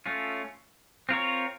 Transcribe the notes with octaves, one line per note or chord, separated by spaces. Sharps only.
A3 C#4 F4
C4 F4 A#4 C#5